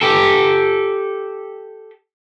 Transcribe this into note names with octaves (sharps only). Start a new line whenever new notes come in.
G4 A4